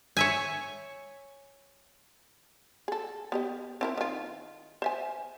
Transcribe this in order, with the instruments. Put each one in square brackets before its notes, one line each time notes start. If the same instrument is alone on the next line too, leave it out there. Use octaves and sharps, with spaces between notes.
[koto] C#5 E5 G#5
[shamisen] G#4 A4
B3 G4 D#5
C4 E4 A#4
D#3 F4
C5 E5 G#5